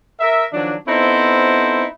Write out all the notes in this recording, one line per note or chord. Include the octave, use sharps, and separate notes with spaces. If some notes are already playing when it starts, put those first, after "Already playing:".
A#4 E5
D#3 F3 F#3 D4
B3 C4 D#4 E4 A4 C5